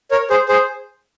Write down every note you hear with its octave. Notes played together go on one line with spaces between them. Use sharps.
A#4 C#5
G#4 C5
G#4 C5